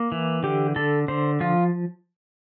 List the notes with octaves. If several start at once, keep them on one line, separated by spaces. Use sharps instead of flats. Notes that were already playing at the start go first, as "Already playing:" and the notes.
Already playing: A#3
E3
D3 G4
D3 A4
D3 C5
F3 F4